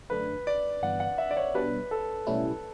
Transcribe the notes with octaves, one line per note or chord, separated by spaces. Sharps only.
F#2 D3 A3 D4 B4
D5
G1 G2 E3 B3 F#5
F#5
E5
D5
C#5
B2 G3 D4 B4
A4
B1 A2 G3 C#4 E4